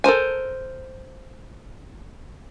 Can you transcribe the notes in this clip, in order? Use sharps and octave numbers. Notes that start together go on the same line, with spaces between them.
A4 A#4 C5 G#5